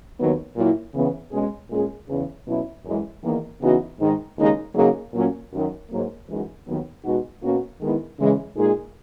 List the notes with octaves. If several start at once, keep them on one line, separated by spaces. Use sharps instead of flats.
D#2 D#3 F#3 B3
A#2 F#3 A#3 E4
C#3 E3 B3
B2 G#3 C#4 G#4
A#2 G#3 C#4 G#4
E2 C#3 E3
B2 F#3 C#4 E4
F#2 E3 G#3
E2 D#3 A#3
C#3 E3 B3 D#4 F#4
G#2 D#3 G#3 D#4
D#2 C#3 G#3 D#4
C#3 F#3 A#3 D#4 G#4
A#2 F#3 A#3 C#4
F#2 D#3 F#3
G#2 F#3 A#3
F#2 E3 G#3 D#4 F#4
D#2 D#3 F#3 B3
B2 G#3 D#4 F#4
B2 A#3 C#4 F#4
D#3 G#3 B3 E4
C#3 E3 G#3
A#2 G#3 D#4 G#4